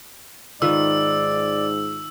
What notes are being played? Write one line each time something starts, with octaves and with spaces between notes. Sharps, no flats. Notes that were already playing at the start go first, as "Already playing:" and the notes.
G#2 D#3 F4 B4 D5 E6